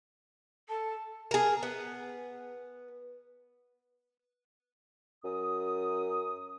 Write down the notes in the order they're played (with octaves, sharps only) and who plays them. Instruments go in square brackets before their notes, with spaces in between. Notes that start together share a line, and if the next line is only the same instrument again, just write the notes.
[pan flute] A4 [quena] A5
[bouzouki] G#4 A#4
B3
[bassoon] F#2 [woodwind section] D#6